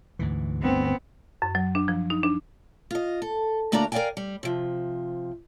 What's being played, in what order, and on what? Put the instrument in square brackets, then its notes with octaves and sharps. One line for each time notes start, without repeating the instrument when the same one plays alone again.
[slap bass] D2 G#2 E3
[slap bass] G1 D2 D3 [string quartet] B3 [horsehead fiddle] C4
[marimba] F#2
F#3
D4
F3
D#4
D4
[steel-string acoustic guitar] F4 D#5
A4
D2 A#3 D4 F#4 D5 A#5
A#4 D5 D#5 F5 G5 G#5
G3
C3 F3